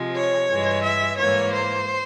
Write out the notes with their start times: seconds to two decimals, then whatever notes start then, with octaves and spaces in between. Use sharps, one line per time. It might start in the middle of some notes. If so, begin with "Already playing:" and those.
Already playing: C3 F3 G#3
0.15 C#5
0.49 G2 E3 G#3
0.84 E5
1.18 G#2 E3 A#3 C#5
1.53 C5